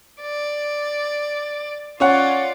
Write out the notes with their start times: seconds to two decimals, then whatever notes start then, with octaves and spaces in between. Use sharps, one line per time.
0.21 D5
2.00 C#4 F4 C#5 D5 F#5